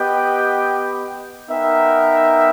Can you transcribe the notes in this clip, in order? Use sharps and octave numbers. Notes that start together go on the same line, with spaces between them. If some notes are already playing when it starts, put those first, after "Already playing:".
Already playing: B3 G4 B4 D#5 G5
B3 D#4 A#4 E5 G5